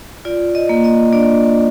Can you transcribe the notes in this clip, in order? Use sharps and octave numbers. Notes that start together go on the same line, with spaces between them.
F4 D5
D#5
A#3
D#5
D4 D5